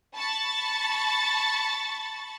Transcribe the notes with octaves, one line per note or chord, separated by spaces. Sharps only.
A5 B5 C#6 A6